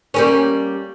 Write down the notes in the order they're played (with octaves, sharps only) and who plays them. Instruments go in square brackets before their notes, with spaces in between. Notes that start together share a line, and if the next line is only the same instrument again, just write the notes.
[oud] G3 A#3 C#4